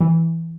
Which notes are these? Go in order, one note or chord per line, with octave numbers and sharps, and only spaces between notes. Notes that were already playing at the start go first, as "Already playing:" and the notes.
E3